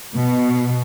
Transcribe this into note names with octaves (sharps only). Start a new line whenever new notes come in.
B2